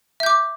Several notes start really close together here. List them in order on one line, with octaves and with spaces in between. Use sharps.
E5 G6 D6